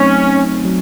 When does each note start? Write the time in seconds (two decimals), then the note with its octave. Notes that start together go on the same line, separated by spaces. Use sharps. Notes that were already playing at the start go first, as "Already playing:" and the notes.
Already playing: F#3 A3 C4 C#4 D#4
0.65 F#3